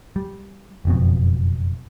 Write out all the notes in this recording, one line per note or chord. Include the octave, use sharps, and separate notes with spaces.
G3
F#1 F2 B2